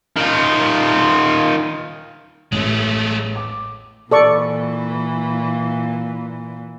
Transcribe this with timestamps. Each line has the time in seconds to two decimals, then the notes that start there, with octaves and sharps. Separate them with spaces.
0.16 D#3 F4
2.52 A1 G#3 A3
3.36 D6
4.11 A#2 E3 A4 D5 C#6